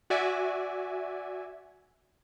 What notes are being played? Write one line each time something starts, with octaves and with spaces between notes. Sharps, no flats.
F#4 D5 E5 G#5